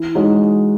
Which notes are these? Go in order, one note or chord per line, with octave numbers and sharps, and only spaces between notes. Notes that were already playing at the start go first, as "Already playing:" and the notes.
Already playing: E3
G#3 D#4 F#4 C#5